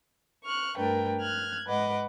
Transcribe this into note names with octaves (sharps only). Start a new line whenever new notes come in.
C#6 F6 F#6
G2 A3 D4 A#4 B4 G5
F6 F#6 G#6
G#2 B4 D#5 F#5 D6